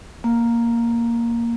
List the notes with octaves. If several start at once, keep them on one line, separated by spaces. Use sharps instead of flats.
A#3